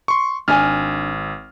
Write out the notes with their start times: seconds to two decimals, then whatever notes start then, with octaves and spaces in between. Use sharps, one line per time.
0.08 C6 C#6
0.48 G#1 D4 G#5 F6